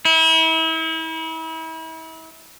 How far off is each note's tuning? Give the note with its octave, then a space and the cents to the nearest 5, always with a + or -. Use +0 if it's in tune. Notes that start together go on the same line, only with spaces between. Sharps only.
E4 -35